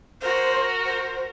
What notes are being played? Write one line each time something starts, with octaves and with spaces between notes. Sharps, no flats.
F#4 A#4 C5
C5